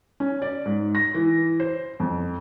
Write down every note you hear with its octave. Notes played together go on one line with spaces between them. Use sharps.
C#4
D5
G#2
A#6
E3
C5
F2